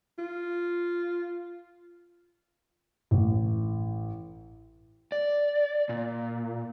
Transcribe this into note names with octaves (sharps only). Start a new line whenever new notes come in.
F4
A1
D5
A#2